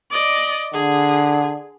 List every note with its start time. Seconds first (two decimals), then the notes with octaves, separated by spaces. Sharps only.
0.11 D5 D#5
0.74 D3 G#4